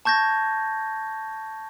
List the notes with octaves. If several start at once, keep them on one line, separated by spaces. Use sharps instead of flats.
A5 C#6 G6 G#6 A#6